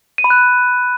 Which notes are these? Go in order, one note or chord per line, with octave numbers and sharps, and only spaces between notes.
D#7
B5
F#6